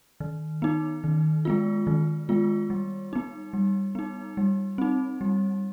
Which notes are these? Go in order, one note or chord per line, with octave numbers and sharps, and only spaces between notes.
D#3
B3 D#4
D#3
G#3 B3 F4
D#3
G#3 B3 F4
G3
B3 D#4
G3
B3 D#4
G3
C4 D#4
G3